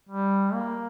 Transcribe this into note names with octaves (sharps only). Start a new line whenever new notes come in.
G3
A#3